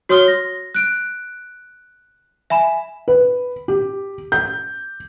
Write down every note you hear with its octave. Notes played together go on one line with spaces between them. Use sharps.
F#4 C#5 C6 D#6 F6 G7
A#6
F#6 D7
E5 G#5 B5 E7
B4
G4
G6